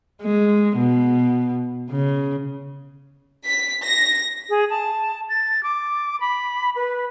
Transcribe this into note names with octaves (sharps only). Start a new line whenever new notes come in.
G#3
B2
C#3
B6
A#6
G#4
A5
A6
D6
B5
B4